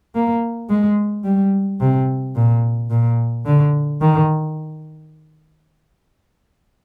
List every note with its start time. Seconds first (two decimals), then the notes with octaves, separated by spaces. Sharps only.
0.15 A#3
0.70 G#3
1.24 G3
1.80 C3
2.36 A#2
2.90 A#2
3.46 D3
4.01 D#3